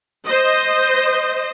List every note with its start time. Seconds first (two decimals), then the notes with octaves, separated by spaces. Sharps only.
0.25 C5 D#5